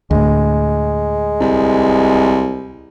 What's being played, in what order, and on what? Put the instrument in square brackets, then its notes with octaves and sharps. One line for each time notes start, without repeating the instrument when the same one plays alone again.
[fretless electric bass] D2 A2 [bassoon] G#3
[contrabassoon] C2